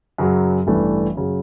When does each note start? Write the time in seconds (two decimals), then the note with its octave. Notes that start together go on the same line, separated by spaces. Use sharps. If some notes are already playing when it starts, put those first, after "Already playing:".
0.18 F#2 C#3 F#3
0.67 A1 G2 E3 A3 D4
1.15 F#2 C#3 F#3